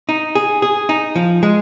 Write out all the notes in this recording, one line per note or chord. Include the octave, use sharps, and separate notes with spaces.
D#4
G#4
G#4
D#4
F3
G#3